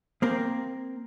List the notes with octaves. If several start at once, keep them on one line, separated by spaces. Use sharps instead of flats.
A#3 C4 A#4